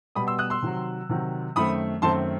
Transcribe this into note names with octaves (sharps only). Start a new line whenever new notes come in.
B2 G3 B3 B5 D#6
C6 E6
D#6 F#6
C6 E6
C3 D#3 F#3
C3 D#3 F#3
F#2 D#3 A3 C4 B5 D#6
F#2 D#3 A3 C4 A5 C6